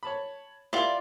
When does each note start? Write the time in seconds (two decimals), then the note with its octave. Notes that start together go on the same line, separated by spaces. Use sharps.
0.03 C#5 A5 B5
0.73 E4 F4 G4 A#4 D5